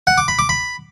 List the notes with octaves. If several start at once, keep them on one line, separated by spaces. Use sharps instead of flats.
F#5
D6
B5
D6
B5